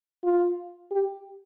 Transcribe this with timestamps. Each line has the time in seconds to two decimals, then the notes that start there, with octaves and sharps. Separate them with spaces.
0.24 F4
0.91 G4